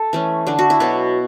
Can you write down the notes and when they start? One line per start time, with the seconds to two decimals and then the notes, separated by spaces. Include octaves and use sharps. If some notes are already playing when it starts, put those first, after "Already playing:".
Already playing: A4
0.13 E3 A3 C#4
0.47 D3 A3 D4
0.59 F#4
0.70 E4
0.80 B2 F#3 B3 F#4